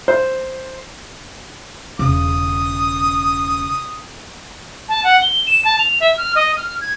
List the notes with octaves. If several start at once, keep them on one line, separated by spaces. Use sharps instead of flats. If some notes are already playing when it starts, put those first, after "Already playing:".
C5
E1 C#3 D#6
A5
F#5
G7
E7
A5
F7
E5
F6
D#5
F6
G#6